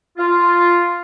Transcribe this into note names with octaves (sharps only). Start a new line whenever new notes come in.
F4